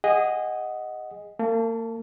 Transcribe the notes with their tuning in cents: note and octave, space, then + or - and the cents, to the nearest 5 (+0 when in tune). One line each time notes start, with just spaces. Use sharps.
G#4 -25 D#5 +0 F#5 +0
A#3 -40 A5 +0